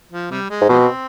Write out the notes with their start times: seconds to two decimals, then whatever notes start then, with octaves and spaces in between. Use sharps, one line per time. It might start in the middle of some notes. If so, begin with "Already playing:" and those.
0.12 F3
0.31 C3 G3
0.50 G#3
0.61 G#2
0.69 B2 F3 G#3 C4